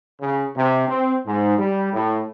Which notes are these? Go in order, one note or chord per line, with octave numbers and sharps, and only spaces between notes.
C#3
C3
C4
G#2
G3
A2